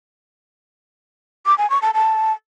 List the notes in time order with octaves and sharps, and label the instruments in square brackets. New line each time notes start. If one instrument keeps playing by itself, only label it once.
[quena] D6
G#5
C#6
A5
A5